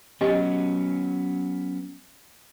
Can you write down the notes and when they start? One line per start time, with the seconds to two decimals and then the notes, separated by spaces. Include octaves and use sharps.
0.21 F#3 B3 C#4 G4 D#5 G#5